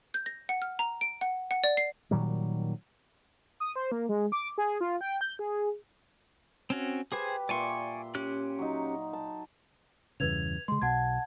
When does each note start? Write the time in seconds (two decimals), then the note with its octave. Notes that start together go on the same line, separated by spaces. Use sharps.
0.14 G6
0.26 A#6
0.49 F#5
0.62 F6
0.79 A#5
1.01 D7
1.21 F#5
1.51 F#5
1.64 D5
1.77 C7
2.11 A#2 D#3 F#3 G3
3.60 D#6
3.76 C5
3.92 A#3
4.09 G#3
4.32 D6
4.58 G#4
4.81 F4
5.01 G5
5.21 G6
5.39 G#4
6.70 C4 C#4 F#4
7.12 G4 G#4 B4 C5 G#5
7.49 A#2 D5 E5 G#5 C6 C#6
8.15 C#4 G4 F#6
8.59 F#3 D#4
9.13 A5
10.20 E2 G2 C#3 B4 G#6 F7
10.68 C#3 G#3 C6
10.82 B1 B2 F#5 A5 G#6